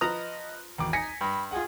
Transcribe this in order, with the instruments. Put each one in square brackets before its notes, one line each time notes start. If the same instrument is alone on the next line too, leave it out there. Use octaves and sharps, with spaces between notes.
[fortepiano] F3 A#5 D#6 [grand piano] B4 [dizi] D#5
[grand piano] G#1 E2 D6 [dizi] G5
[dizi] D#4 [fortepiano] G#5 [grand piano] A#6 B6 C#7
[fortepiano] G2 [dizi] B5
[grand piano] F4 F#5 [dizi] G#4